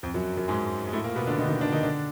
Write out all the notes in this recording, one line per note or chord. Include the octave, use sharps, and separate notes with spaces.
F2 F3
F#2 F#3
F#2 F#3
G#2 G#3
G#3
A2 A3
A#2 A#3
B2 B3
D3 D4
D#3 D#4
D#3 D#4
D3 D4
D#3 D#4
D3 D4